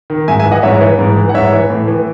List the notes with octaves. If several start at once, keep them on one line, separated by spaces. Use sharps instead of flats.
D#3
G#2 E5 G#5
E5 G#5
E3
D#5 F#5
G#2 C#5 E5
E3
G#2
E3
F#5
G#2 C#5 E5
E3
A2
E3